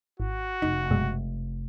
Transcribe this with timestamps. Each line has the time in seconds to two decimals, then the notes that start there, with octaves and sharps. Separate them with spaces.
0.20 G#1 F#4
0.62 F1 D#4
0.91 F#2 B2 G#3